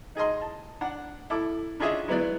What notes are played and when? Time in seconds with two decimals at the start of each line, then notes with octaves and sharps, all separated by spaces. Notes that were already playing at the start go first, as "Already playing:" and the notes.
0.15 D#4 G#4 D#5 C6
0.41 A5
0.81 D4 F#5
1.30 E4 A4 D6
1.80 C#4 D4 F4 G#4 D#5 E5
2.08 F#3 G#3 B3 E4 B4 D5